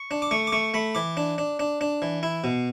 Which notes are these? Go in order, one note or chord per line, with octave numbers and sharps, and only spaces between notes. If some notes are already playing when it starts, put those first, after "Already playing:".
Already playing: C#6
D4
D6
A3 C#6
D6
A3 C#6
A3 B5
E3 D6
D4
D4
D4
D4
E3
E4
B2